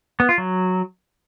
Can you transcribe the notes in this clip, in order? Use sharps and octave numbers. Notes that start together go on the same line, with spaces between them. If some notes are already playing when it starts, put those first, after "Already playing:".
B3
F4
F#3